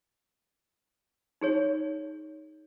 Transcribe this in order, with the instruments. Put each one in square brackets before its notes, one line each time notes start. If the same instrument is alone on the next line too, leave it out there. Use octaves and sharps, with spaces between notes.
[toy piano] D#4 G#4 C#5